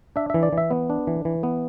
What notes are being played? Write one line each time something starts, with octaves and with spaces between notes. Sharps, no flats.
D4 E5
E3 E5
D5
E3 E5
B3
D4
E3
E3
B3